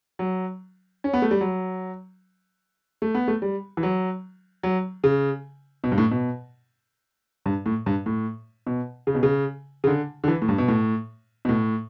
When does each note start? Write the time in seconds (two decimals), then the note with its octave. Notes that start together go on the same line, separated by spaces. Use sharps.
0.19 F#3
1.04 C#4
1.13 B3
1.22 A3
1.31 G3
1.41 F#3
3.02 A3
3.15 B3
3.28 A3
3.42 G3
3.77 E3
3.83 F#3
4.63 F#3
5.04 C#3
5.84 B2
5.92 G2
5.98 A2
6.11 B2
7.46 G2
7.66 A2
7.86 G2
8.06 A2
8.67 B2
9.07 C#3
9.15 B2
9.23 C#3
9.84 C#3
9.87 D3
10.24 D3
10.28 E3
10.42 A2
10.48 G2
10.58 B2
10.68 A2
11.45 B2
11.49 A2